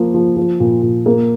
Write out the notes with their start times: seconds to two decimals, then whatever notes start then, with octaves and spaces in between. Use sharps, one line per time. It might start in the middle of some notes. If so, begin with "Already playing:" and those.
Already playing: F3 A#3 F4
0.14 F3
0.37 F3
0.60 A#2
0.82 A#2
1.06 A#3